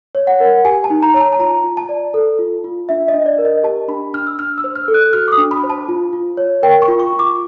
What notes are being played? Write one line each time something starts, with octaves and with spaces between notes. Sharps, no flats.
C#5
F#5
A#4
G4 G#5
A5
D#4
A#5
C#5 A#5
A5
A5
F4 A#5
F4
A5
D5
A4
F4
F4
D4 E5
D#5
D4
D5
A#4
D#5
G4 A5
D4 B5
D4 F6
E6
D4 F6
E6
C5
F6
A4
F#6
F#4 F6
D6
D#6
D4
B5
C5
A5
F4
F4
C#5
A#4 G5
C#6
F4
C#6
F4
D6